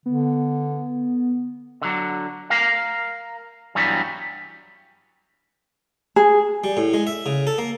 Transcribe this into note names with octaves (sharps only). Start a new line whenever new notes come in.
D3 B3
D3 F#3
A#4 F5
G2 E3 F#3 G3 B3
G#4
G3
A2
G#3
E5
C#3
A4
A#3